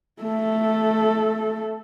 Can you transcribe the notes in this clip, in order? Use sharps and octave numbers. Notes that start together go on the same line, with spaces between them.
A3 A4